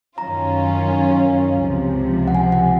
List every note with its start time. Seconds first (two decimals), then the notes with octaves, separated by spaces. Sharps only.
0.18 F#2 D#3 F#3 C#4 F4 A#5
1.62 C#2 C3 F3
2.28 F#5
2.35 G#5
2.52 F#5